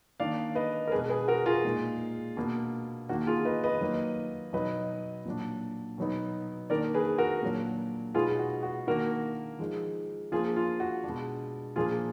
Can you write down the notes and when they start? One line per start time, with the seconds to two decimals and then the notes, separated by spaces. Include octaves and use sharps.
0.20 D#3 A#3 D4 D5 F5
0.55 B4 D#5
0.88 A#4
0.91 B2 G#3 D4 G#4 B4
1.09 G#4 B4
1.28 F#4 A#4
1.46 F4 G#4
1.64 A#2 G#3 D#4
2.37 B2 A#3 D4
3.09 D#3 A#3 D4 F#4
3.26 F4 G#4
3.45 B4 D#5
3.64 B4 D#5
3.81 D#3 F#3 A#3 D#4
4.53 B2 F#3 B3 D#4 B4 D#5
5.25 A#2 F#3 D4
5.98 B2 F#3 B3 D#4
6.70 D#3 A#3 D4 A#4 D5
6.94 G#4 B4
7.18 F#4 A#4
7.42 A#2 F#3 D4
8.14 B2 G#3 B3 D#4 F4 G#4
8.39 F#4
8.63 F#4
8.87 D#3 A#3 D4 F#4 A#4
9.59 F3 G#3 D#4
10.32 F3 A#3 D4 F4 G#4
10.56 F4
10.80 F#4
11.04 B2 G#3 D4
11.76 A#2 F3 A#3 D4 F4 G#4